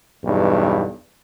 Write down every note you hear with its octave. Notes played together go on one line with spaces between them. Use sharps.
B1 E2 G2